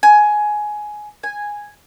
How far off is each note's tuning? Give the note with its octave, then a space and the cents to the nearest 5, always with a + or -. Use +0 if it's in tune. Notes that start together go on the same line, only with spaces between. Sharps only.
G#5 +15
G#5 -5